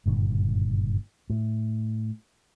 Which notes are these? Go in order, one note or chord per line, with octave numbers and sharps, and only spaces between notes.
F#1 G2 A#2 D3
A2